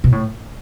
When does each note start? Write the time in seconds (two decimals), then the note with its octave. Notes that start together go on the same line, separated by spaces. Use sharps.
0.04 B2
0.12 A2